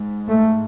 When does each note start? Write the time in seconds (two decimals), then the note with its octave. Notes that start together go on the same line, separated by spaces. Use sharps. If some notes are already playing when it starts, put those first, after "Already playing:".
Already playing: G#2
0.28 A3